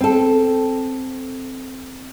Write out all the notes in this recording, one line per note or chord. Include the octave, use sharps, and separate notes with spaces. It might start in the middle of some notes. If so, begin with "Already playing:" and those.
C4 A4